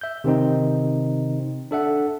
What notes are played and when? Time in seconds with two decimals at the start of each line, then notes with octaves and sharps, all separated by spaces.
0.01 E5 G6
0.24 C3 D#3 C4 D#4
1.71 D4 A4 E5 F#5